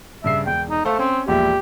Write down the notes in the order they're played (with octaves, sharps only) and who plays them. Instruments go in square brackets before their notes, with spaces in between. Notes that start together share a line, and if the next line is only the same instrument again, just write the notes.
[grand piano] G2 C#3 C7 [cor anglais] E5
[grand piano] E1 [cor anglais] G5
[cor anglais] D#4
[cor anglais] A3 [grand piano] A4 C5 F5
[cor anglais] C4 [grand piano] C#4
[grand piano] E1 A#1 E5 [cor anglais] G4